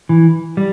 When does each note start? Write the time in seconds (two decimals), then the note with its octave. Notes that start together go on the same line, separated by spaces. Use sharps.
0.09 E3
0.57 G3